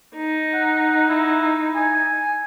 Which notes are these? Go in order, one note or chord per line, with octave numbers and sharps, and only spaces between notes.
D#4
F#5
E4
G#5